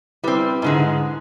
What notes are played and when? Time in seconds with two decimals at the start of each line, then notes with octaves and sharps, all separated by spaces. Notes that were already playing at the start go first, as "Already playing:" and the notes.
0.24 G3 C4 E4 B4
0.62 G#2 D3 G#3